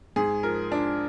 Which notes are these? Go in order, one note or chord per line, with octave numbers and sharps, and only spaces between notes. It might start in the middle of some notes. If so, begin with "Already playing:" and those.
G#2 G#4
F3 A#4
F3 D4